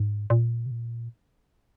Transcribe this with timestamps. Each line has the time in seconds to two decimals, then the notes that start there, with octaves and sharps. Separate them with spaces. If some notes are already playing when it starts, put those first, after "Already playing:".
Already playing: G#2
0.30 A#2
0.66 C3
0.71 A#2